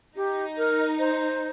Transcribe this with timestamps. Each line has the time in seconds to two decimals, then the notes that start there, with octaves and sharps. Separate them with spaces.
0.16 D#4 G4
0.58 A#4
0.99 C5